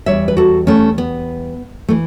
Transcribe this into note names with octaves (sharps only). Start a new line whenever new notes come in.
E2 C#3 G3 C#5 E5
B4
F#4 A4
A3 C#4
B3
E3 A3